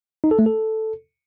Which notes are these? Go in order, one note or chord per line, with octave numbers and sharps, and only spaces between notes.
D#4
A4
A3
A4